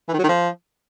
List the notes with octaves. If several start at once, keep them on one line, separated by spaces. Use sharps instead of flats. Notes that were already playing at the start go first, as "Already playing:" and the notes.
E3
D#3
F#3
D#3
F3